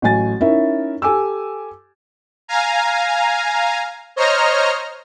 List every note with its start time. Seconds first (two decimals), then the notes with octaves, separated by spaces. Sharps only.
0.02 A1 F#3 G#5 A6
0.41 C#4 D#4 E4 A#4 E5
1.02 G4 A4 G#5 D6 E6
2.48 F5 G#5 A#5
4.16 C5 C#5 D#5 A#5 F6